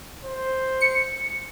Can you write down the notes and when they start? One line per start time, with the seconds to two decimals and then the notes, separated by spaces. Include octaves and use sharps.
0.24 C5
0.81 C#7